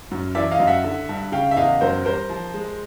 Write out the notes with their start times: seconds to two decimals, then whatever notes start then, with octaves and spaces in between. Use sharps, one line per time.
0.11 F#2
0.35 E3 D5 E5
0.51 D#5 F5
0.60 F#2
0.67 E5 F#5
0.84 D3
1.09 G2
1.32 C#3 F5 G5
1.51 E5
1.56 E2 D#5 F5
1.81 F#2 A#4 C5
2.05 G3 A#4 C5
2.30 F3
2.54 G#3